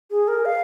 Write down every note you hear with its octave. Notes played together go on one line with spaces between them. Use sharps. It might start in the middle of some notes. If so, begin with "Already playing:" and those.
G#4
A#4
F5